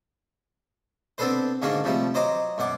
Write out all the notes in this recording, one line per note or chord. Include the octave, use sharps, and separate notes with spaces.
B3 C4 D4 A4 B4 C5
G#2 D3 A#3 C#4 D4 F#4
C3 F3 G3 A3
F#3 C5 D#5 A#5 D6
F#2 B2 F#5 D6